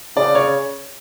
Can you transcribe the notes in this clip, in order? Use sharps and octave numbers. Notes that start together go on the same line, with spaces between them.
C#3 D5
C#5